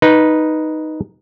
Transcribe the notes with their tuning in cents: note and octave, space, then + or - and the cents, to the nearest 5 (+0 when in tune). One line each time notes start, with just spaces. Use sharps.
D#4 +0 B4 -10